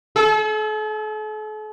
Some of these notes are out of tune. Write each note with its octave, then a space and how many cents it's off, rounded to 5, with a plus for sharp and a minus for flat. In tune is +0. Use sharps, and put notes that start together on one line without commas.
A4 -45